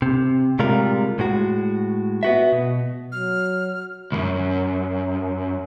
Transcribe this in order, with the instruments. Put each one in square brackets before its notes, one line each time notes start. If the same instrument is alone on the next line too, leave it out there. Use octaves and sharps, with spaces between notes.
[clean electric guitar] C3
A2 C3 G3 G#3 F4 A#4
A2 G#3 F#4
B3 F#4 E5
B2
[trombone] F#3 [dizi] F6
[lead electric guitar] C2 F#2